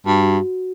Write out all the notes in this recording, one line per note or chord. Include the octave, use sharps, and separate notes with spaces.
G2 F#4
F#4